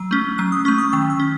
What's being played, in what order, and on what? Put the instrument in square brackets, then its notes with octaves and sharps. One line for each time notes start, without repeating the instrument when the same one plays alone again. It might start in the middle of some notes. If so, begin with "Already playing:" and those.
Already playing: [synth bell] F#3 E6
A3 C#4
F#3 F#6
D#6
A3 C#4 C#6
D#6
D#3 E6
E6
C#4